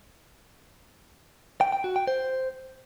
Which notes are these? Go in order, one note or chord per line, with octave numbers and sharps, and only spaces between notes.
G5
G5
F#4
G5
C5